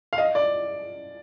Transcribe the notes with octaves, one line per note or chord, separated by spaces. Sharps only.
F5
D#5
D5